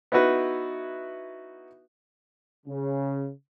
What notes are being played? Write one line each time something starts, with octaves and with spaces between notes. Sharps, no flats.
B3 D#4 E4 F#4 B4
C#3